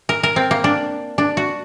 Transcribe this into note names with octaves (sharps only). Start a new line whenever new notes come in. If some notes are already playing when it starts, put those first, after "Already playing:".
A#4
A#4
C4
A#3
D4
D4
F#4